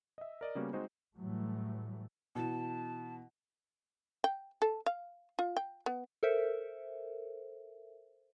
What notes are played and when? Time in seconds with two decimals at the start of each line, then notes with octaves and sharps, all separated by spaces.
0.18 D#5 E5
0.41 A#4 D5 D#5
0.55 C#3 G3 A#3 B3 C#4 F#4
0.73 G#3 C4 D#4 F#4 C5
1.16 A2 E3 F#3 G3 A3
2.35 B2 E3 A5
4.24 G5
4.62 A4
4.86 F5
5.39 F4
5.57 G5
5.86 B3
6.23 A4 A#4 C5 E5